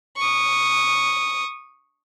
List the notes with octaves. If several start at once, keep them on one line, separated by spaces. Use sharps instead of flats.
C#6 D#6